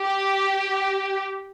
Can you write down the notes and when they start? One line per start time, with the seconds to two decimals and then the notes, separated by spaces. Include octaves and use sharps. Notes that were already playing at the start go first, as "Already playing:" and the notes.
Already playing: G4